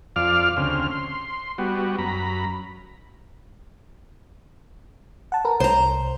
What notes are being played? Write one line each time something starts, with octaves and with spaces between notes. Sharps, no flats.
F2 D5 F5 F6
D2 C#3 C4 F6
C6
G3 B3 F#4
F#2 A#5 B5
F#5 A5
A#4 B4
C2 C5 A#5